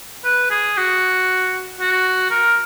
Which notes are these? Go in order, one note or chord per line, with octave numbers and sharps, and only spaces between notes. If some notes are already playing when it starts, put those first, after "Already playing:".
B4
G#4
F#4
F#4
A#4